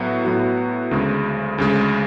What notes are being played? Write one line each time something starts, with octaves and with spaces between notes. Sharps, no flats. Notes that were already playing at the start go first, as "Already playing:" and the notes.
Already playing: A2 F#3 B3 F#4
A2 F#3 B3 F#4
D2 C#3 G#3
D2 C#3 G#3